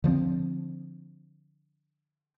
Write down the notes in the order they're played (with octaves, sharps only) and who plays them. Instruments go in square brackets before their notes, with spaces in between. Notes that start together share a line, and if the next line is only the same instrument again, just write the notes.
[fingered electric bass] D3 F3 G#3 C4